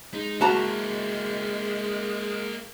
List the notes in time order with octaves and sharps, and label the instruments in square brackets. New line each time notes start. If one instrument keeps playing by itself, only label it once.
[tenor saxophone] G#3 [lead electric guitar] D#4
[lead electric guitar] A#3 E4 [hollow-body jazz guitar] F#4 A5 A#5